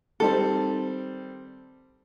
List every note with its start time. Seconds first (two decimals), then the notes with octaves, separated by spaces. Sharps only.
0.20 D#3 G3 C4 A4